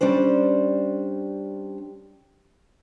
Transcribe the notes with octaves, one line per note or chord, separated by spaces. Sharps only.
G3 C#4 D4 C5